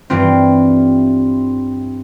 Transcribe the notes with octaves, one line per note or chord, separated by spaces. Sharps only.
G2 E3 G3 C4 F4